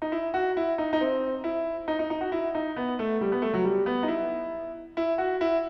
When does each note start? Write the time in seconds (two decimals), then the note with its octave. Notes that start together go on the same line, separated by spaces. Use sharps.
0.02 D#4
0.12 E4
0.34 F#4
0.57 E4
0.78 D#4
0.93 D#4
1.01 C4
1.44 E4
1.88 D#4
1.99 D#4
2.10 D#4
2.21 F#4
2.32 E4
2.55 D#4
2.76 B3
2.99 A3
3.21 G3
3.32 B3
3.42 A3
3.53 F#3
3.64 G3
3.86 B3
4.03 D#4
4.08 E4
4.97 E4
5.18 F#4
5.41 E4